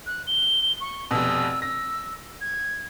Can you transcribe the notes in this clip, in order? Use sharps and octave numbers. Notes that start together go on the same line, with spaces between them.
F#6
G7
C#6
F1 B2 E6
E6 A#6
G#6